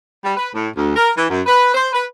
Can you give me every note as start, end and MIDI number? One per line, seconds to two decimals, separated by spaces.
0.24 0.33 55
0.37 0.50 71
0.54 0.69 45
0.76 0.92 38
0.96 1.11 70
1.17 1.26 52
1.30 1.42 42
1.46 1.71 71
1.75 1.88 72
1.93 2.05 71